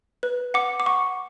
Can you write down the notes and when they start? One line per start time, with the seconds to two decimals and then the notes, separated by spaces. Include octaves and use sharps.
0.23 B4
0.54 F#5 D6
0.80 D6
0.86 F#5 C#6